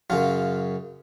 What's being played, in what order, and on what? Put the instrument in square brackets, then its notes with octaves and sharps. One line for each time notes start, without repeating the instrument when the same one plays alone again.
[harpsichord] F#2 C#3 F#3 F4